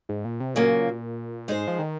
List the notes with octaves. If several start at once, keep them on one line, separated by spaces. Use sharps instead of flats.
G#2
A#2
C3
A#2 C#3 F#3 A#3
G#2 G#3 D#4 G#4 C5
F3
D#3